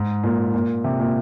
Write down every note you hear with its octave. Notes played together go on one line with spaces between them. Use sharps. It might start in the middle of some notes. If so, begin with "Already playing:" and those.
Already playing: G#2
A#2
A#2
C3
A#2